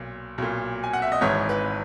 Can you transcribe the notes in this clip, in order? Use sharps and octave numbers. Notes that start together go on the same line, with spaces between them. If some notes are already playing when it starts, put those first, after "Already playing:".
Already playing: B1 A#2
B1 A#2
G#5
F#5
E5
D#5
G#1 G#2 E3 C#5
B4